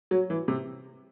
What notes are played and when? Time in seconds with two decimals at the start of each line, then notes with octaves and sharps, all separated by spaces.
0.11 F#3
0.30 E3
0.48 C3